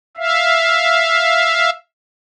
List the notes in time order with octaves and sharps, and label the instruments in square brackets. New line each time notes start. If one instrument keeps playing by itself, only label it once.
[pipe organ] E5 F5